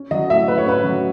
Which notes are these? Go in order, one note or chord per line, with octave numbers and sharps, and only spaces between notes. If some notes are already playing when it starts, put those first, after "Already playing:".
Already playing: C#4
F#3 D#5
A2 E5
A2 B4
C#5
C#4 B4
F#3